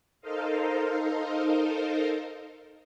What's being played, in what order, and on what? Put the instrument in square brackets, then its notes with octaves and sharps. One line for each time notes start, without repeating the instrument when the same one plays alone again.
[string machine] D#4 A4 A#4 C5 D#5 F5